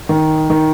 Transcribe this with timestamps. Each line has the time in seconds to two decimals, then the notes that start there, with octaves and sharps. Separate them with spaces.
0.09 D#3
0.50 D#3